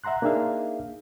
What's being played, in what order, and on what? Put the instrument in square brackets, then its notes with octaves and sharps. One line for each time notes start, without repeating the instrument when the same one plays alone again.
[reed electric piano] E5 F#5 A#5 C6 F#6
A#3 D4 D#4 G#4 E5 F5